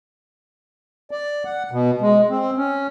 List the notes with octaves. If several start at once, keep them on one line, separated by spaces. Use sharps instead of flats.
D5
F#5
B2
G#3
C4
C#4